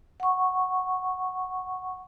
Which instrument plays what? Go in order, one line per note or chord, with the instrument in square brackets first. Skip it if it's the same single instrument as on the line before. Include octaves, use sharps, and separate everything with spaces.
[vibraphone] F#5 C#6